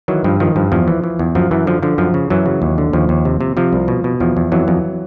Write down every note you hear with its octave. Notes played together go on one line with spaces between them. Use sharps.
D#3 E3 F#3
G2 F3
D#3 F3
G2 F3
E2 F3
E3
E3
E2
F#2 F3
F#2 E3
D3 F3
D3 F3
F#2 F3
C#3
F#2 E3 F#3
C#3
D#2
D3
D#2 F3
D#2
C3
C3
C3 F3
C2
B2
B2
E2 F3
E2
F2 E3 F#3
F2